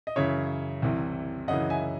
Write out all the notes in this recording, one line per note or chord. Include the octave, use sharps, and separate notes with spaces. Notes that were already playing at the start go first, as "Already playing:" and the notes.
D#5
F#2 C#3 E3 C#5 E5
C2 C3 E3
F#2 C#3 E3 D#5 F#5
E5 G#5